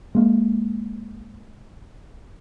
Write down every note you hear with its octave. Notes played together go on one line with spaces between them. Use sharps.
G#3 A#3